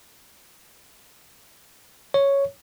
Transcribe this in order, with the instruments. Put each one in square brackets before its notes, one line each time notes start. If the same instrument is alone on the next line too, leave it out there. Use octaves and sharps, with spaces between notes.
[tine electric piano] C#5